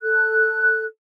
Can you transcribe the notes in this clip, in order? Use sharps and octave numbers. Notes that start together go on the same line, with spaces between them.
A4 F#6